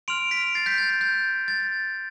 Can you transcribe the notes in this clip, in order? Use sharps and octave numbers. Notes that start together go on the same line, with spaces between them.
C6 F6 D7 F7
B6 D7
A6 C7
G6 B6
A6
A6
G6
A6